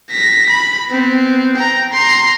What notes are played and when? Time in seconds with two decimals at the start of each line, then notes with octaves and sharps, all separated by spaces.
0.11 A#6 B6
0.50 B5
0.89 B3 C4
1.57 G5 A#5
1.93 A#5 C6